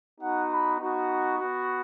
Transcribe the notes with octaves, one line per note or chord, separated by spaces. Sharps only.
B3 D#4 F#4 F#5
B5
B3 D#4 F#4
C#6
B3 F#4